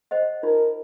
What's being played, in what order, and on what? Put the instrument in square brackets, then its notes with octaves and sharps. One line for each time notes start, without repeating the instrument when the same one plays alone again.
[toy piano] C5 D#5 F#5
[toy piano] D#4 F4 [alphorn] A#4